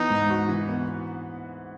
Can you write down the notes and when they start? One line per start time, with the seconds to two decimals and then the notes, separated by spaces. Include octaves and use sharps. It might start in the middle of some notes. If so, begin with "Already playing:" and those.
Already playing: E3 B3 D#4
0.10 G#2
0.30 F#4
0.49 E3
0.69 B3